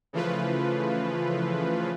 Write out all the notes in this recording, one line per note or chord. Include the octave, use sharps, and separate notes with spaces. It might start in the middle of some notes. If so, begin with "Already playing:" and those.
C#3 E3 F3 A3 F4 B4